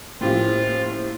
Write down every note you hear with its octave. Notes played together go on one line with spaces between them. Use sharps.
A2 F3 A#3 C#4 F4 G4 C5